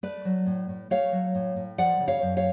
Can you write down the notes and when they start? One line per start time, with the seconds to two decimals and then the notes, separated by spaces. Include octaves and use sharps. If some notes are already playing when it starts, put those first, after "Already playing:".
0.03 A3 B4 D5
0.25 F#3
0.46 A2
0.69 A2
0.90 A3 C#5 F5
1.12 F#3
1.35 A2
1.56 A2
1.78 F3 D5 F#5
2.00 C#3
2.07 C#5 F5
2.22 F#2
2.37 C#5 F5